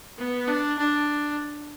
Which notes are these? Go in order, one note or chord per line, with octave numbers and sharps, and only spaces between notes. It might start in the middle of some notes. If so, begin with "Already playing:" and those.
B3
D4
D4